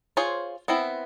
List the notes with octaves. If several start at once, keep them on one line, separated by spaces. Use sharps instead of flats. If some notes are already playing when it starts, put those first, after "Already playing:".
F4 G#4 C5 C#5
B3 C4 E4